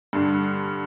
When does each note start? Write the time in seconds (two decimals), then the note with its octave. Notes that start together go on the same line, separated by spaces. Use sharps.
0.13 G2 D3 G3 D4